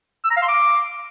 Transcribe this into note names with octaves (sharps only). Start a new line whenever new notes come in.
E6
A#5
F5
C6
D6